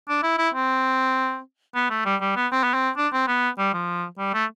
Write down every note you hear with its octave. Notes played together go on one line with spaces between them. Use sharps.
D4
E4
E4
C4
B3
A3
G3
G3
B3
C4
B3
C4
D4
C4
B3
G3
F3
G3
A3